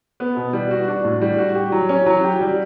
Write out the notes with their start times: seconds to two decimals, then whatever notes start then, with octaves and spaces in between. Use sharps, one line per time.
0.20 B3
0.36 B2
0.53 G3
0.71 F#4
0.88 D4
1.04 A2
1.21 G3
1.38 F#4
1.55 G4
1.72 F#3
1.89 C#4
2.06 F#3
2.24 G4
2.41 G3